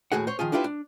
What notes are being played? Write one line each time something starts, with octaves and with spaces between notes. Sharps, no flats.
D#2 A2 E3 F#4 G#4 F#5
C5 C#5
D#3 F3 F4 G#4
D4 E4 F4 G4 A#4 B4
D4